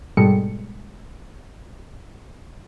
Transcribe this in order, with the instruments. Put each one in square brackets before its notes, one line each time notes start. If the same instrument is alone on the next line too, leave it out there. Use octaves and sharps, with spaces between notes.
[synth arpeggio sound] G#2 B2 G3 G#3 A4 C#7